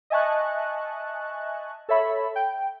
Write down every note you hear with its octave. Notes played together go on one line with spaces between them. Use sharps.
D#5 E5 G#5 A5 C#6 F#6
A4 C#5 E5 B5
G5